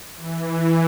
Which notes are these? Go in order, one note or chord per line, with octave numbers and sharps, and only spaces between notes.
E3